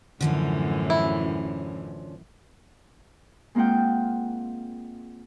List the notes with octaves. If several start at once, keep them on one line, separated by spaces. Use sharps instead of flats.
F#2 A2 D3 E3 F3 C#4
E4
G#3 A#3 C4 F4 F#5 G5